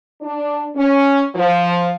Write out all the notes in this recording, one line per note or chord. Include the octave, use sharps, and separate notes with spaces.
D4
C#4
F3